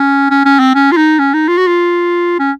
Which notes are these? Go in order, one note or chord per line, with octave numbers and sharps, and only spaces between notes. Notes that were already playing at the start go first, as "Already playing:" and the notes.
Already playing: C#4
C#4
C#4
C4
C#4
F4
D#4
C#4
D#4
F4
F#4
F4
C#4